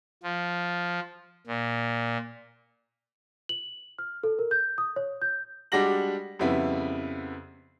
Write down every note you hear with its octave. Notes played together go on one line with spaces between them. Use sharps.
F3
A#2
F#7
F6
A4
A#4
G6
D#6
C#5
G6
G3 G#3 D4 F#4 A#6 F#7
F2 C#3 G3 B3 E4